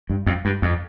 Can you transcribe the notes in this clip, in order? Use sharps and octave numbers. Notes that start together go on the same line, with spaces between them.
G2
F2
G2
F2